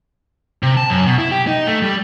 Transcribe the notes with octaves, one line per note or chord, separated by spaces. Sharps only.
C3
A5
F#2
B2
E4
G4
D#4
A3
G3